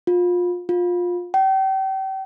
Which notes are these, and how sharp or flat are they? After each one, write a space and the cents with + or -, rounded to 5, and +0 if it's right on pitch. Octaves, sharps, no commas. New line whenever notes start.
F4 +25
F4 +20
G5 -35